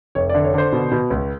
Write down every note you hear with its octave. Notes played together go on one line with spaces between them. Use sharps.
F1 C#5
D5
D3
C#5
D3 C5
B2
B2
C#2